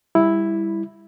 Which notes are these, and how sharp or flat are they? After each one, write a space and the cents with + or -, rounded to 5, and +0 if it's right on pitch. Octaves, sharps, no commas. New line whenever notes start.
G3 +25 E4 +0